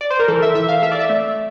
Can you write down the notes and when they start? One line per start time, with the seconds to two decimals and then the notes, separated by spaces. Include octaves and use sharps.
0.01 D5
0.10 C5
0.19 A#4
0.28 E3 A4
0.42 E5
0.55 E3 E5
0.68 F5
0.82 A3 E5
0.92 D5
1.00 E5
1.10 A3